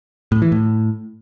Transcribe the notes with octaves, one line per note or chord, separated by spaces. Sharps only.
A2
E3
A2